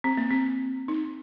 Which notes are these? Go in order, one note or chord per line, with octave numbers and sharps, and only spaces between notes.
C4
A#3
C4
D#4